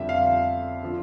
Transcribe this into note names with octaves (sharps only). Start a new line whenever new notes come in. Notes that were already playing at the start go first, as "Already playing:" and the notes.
Already playing: F2 D3 G3 E5
F5
D3 F3